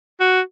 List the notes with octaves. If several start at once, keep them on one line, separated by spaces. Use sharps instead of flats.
F#4